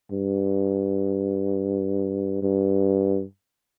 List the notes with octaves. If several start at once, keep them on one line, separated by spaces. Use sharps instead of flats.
G2
G2